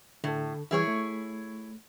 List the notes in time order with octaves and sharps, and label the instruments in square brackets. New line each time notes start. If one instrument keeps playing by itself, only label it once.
[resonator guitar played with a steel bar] A2 [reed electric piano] D3 A4
[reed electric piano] E3 G3 [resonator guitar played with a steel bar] E4 G#4 C#5
[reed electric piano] A3